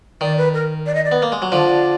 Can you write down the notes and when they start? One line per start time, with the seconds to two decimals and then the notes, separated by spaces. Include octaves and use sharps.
0.21 D#3 D5
0.38 B4
0.54 A#4
0.86 D5
0.95 D#5
1.05 D5
1.12 B3
1.22 A#3
1.32 G#3
1.42 F#3
1.52 D3 F3 D5